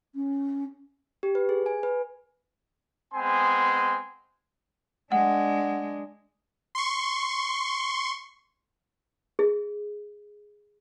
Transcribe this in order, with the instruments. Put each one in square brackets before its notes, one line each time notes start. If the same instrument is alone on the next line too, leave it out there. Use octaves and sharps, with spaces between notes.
[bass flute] C#4
[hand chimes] G4
B4
G#4
G#5
B4
[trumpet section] G#3 B3 C4 G#5 C6
[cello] G#3 D4 [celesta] F#5
[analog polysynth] C6 C#6
[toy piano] G#4